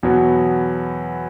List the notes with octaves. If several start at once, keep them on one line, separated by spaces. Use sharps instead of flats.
E2 B2 F#3 B3